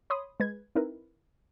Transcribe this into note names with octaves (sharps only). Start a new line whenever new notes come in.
C#5 B5 C6 D#6
G#3 B4 G#6
C4 D#4 E4 A#4 B4